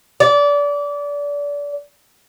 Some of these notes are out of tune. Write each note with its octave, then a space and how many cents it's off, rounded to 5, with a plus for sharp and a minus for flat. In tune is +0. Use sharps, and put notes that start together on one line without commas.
D5 -25